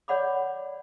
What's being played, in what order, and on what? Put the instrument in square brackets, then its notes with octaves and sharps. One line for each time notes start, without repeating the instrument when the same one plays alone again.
[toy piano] C#5 D5 F#5 B5 D6